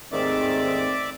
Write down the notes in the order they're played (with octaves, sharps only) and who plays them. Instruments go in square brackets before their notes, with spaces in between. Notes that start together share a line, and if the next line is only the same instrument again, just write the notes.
[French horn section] D#2 A3 C4 [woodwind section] G#2 D#3 [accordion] D5 E5 D6